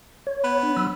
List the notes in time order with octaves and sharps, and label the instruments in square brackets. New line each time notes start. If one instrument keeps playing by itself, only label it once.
[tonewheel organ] C#5
[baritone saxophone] B3
[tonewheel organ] D4
F#3 B5 E6